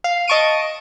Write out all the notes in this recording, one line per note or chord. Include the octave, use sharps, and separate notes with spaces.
F5
D#5 A5 C#6 D7 D#7